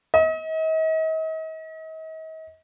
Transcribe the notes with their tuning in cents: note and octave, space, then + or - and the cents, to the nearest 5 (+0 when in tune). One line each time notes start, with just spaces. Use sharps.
D#5 +40